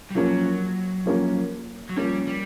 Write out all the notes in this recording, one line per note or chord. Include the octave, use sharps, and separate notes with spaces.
G3
F3 F#3 A#3 C#4
F3 A#3 C#4
F#3
F3 G3 A#3 C#4
G3